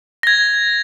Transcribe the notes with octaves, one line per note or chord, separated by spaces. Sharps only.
G#6 A#6